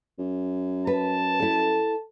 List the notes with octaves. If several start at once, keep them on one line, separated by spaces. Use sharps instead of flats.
F#2
B4 A5
E4 A4